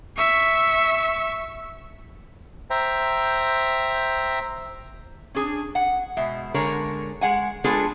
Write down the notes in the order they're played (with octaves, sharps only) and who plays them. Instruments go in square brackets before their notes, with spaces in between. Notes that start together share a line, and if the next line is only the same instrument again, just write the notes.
[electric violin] E5 C#6
[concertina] C5 E5 G5 A#5
[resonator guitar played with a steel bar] C#4 D4 G#4
F#5
B2 G#3 E5
D3 G#3 A#4 C#5
G#3 F#5 G#5
G#3 B3 D4 F4 G#4 A4